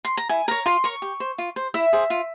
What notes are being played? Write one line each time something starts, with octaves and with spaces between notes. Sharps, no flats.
C6
A#5
E4 G#5
A#4 C#5 A#5
F4 C6
A#4 C#5 C#6
G4
C5
F4
C5
E4 E5
G#4 C5
F4